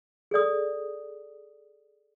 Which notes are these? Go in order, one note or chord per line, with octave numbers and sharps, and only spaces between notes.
G#4 A4 D5 D#6